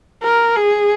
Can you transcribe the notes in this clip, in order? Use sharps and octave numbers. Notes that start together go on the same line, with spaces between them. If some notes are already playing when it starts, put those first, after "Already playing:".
A#4
G#4